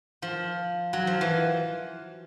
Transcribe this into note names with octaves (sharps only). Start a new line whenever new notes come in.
F3
F#3
F3
E3